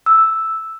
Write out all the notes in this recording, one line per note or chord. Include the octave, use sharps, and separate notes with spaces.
E6